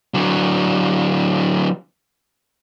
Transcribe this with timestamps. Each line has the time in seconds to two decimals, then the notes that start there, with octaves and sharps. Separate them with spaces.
0.14 D3 F#3